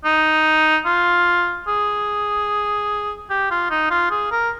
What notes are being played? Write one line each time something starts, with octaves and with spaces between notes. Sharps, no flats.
D#4
F4
G#4
G4
F4
D#4
F4
G#4
A#4